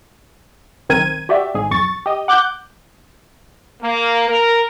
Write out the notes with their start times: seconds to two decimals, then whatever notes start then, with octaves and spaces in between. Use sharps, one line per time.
0.89 B1 D#3 C4 A#4 G#6 D#7
1.29 F#4 G4 D5 E5
1.54 G#1 G#2 G#4
1.71 B1 F2 C#6 A6
2.06 G4 D#5
2.28 F#5 D6 F#6 G6
3.82 A#3
4.28 A#4